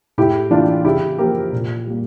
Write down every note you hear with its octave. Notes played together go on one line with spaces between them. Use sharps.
A2 E4 G4
E3 A#3 D4 F4
C#3 E4 G4
F3 A#3 G4 A#4
A#2
G3 A#3